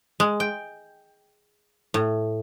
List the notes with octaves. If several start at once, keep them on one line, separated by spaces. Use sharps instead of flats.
G#3
G5
A2